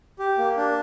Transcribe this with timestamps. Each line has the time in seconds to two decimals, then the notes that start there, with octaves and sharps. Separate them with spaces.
0.19 G4
0.38 A#3
0.57 D4